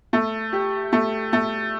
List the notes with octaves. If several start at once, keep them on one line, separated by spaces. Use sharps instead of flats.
A3
G4
A3
A3